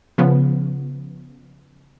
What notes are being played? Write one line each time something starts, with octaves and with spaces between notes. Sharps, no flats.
C#3 F3 B3